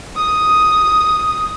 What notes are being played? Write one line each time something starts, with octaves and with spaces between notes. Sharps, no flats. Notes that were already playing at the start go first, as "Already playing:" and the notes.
D#6